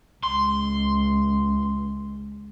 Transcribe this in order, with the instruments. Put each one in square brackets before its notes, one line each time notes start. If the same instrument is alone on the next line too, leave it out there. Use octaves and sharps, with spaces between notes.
[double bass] C#2 [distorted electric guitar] C6